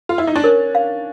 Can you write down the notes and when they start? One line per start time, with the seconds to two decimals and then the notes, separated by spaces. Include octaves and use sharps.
0.09 F4
0.18 E4
0.27 D#4
0.36 D4
0.44 C#4 A#4
0.75 F5